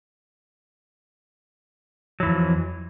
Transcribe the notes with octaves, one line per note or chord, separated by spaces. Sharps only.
F2 E3 F#3